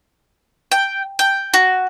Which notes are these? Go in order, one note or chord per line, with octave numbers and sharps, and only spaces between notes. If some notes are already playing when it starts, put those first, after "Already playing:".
G5
G5
F#4